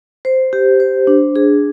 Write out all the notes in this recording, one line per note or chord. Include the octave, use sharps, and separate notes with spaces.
C5
G4
C5
D4
G#4